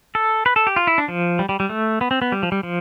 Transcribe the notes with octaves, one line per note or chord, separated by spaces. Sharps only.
A4
B4
A4
G4
F4
E4
D4
F3
G3
G3
G3
A3
B3
C4
B3
G3
F3
G3
F3